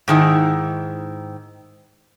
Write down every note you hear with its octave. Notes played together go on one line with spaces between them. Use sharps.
G#2 D#3 E4